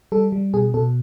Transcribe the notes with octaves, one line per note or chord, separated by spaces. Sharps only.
G3 A4
G3
B2 G#4
B2 A4